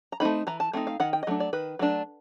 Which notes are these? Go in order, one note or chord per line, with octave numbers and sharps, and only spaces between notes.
A#5
A3 C4 D#4 B5
E3 A#5
A5
A3 C4 D#4
F5
D#3 F#5
G5
D#5
F#3 A3 D4
D5
D#3 B4
F#3 A3 D4